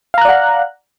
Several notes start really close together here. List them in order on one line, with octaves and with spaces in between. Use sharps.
F5 A#5 F#6 D5 F#5